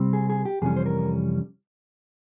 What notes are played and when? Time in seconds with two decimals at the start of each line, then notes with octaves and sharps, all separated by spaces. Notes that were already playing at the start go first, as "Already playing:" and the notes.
Already playing: C3 G3 C4
0.13 G#4
0.30 G#4
0.45 G4
0.62 F2 C3 E3 G3 C#4 G#4
0.76 C5
0.86 A#4